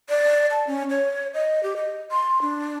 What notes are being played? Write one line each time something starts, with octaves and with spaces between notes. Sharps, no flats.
D5
A5
C#4
C#5
D#5
G4
D#5
C6
D4